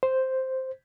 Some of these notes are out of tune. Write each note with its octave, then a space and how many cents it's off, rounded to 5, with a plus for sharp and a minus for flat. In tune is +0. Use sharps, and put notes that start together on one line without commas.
C5 +0